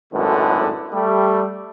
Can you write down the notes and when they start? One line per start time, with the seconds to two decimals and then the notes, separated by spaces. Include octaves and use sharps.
0.13 G#1 F#2 A2 D3 G#3 B4
0.93 G3 A3